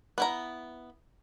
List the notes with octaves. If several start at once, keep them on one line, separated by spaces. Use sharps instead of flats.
B3 E4 A#5